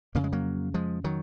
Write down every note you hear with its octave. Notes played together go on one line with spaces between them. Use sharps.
F2 C#3 A#3
G#3
F#3 A#3
F3 G#3
D#3 F#3